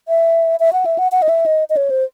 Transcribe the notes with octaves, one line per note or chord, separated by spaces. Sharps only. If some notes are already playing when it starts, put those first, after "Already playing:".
E5
E5
F#5
E5
F#5
F#5
D#5
E5
D#5
D#5
C#5
C5